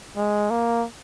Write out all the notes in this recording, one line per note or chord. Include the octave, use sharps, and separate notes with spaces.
G#3
A#3